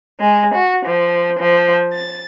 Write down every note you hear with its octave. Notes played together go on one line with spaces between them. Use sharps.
G#3
F#4
F3
F3
A6